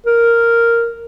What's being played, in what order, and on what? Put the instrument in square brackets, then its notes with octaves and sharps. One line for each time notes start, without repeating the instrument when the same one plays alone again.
[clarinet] A#4